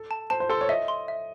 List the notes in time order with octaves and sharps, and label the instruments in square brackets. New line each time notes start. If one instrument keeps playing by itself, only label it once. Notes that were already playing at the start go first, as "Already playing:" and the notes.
Already playing: [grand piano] A4
[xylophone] A5
[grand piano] C5 [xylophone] A5
[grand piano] C5
[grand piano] A4 [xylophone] C6
[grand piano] C#5
[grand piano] D#5 [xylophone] E5
[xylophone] C6
E5